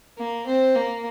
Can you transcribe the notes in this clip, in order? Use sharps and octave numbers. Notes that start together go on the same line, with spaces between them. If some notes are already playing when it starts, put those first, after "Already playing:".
A#3
C4
A#3